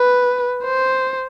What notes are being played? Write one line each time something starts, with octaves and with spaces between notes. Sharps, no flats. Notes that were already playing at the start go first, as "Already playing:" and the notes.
Already playing: B4
C5